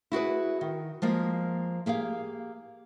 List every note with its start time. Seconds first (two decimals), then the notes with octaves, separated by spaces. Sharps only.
0.12 E4 F#4 G#4 B4
0.61 D#3
1.02 F3 G#3 A#3
1.86 A#3 G4 G#4 F5